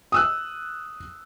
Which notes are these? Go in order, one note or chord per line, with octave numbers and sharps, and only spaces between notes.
D#6 E6 F#6